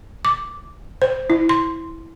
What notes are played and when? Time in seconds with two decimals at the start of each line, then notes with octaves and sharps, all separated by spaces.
0.25 D6
1.02 C5
1.30 E4
1.49 C6